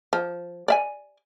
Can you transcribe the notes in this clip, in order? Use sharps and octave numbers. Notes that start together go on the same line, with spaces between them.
F3
D5 E5 G#5